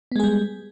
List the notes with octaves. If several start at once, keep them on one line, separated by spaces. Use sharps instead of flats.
G3 G#3 B3 G#4